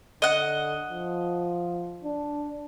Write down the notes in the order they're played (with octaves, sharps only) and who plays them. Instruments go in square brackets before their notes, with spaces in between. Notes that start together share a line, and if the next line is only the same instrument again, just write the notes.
[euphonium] D3 [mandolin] D#5 F#5
[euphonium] F3
D4